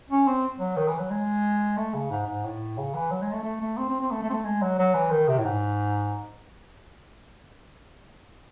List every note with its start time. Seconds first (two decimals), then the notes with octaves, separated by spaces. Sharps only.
0.10 C#4
0.27 C4
0.60 F#3
0.76 D#3
0.88 E3
0.99 F#3
1.10 G#3
1.77 A3
1.94 C#3
2.11 G#2
2.26 G#2
2.44 A2
2.77 C#3
2.94 E3
3.11 F#3
3.22 G#3
3.33 A3
3.43 A3
3.61 A3
3.77 C4
3.89 C4
4.00 C4
4.11 A3
4.22 A3
4.30 C4
4.33 A3
4.45 G#3
4.61 F#3
4.78 F#3
4.94 E3
5.11 D#3
5.28 C3
5.39 A2
5.45 G#2